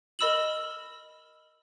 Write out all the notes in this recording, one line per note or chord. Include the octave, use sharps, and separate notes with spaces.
A#4 D#5 B5 E6 E7 F#7